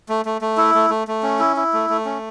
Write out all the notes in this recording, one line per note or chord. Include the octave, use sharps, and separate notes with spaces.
A3
A3
A3
E4
A3
A3
A3
C#4
E4
E4
A3
A3
C#4